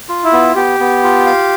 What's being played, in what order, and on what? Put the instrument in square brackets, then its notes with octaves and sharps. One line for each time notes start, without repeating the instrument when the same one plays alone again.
[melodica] F4
[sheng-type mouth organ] E4
[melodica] B3
[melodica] B3 [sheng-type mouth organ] G4
[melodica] B3
F4
F5